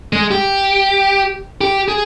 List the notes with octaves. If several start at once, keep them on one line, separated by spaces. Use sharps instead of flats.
G#3
G4
G4
G#4